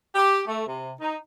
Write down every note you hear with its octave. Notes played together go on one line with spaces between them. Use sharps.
G4
A3
C3
D#4